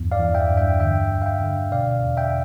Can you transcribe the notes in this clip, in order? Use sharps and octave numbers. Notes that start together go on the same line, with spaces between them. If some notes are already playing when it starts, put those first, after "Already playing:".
Already playing: E2 G2
D5 F5
E3
E5 G5
G2
E5 G5
D3 E5 G5
D2
F5
E5 G5
D3
B2 D5 F5
E2
E5 G5